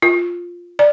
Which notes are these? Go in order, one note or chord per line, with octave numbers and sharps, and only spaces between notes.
F4
D5